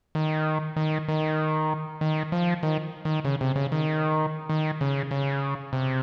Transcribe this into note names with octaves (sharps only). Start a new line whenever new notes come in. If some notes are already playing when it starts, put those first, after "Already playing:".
D#3
D#3
D#3
D#3
F3
D#3
D#3
C#3
C3
C#3
D#3
D#3
C#3
C#3
C3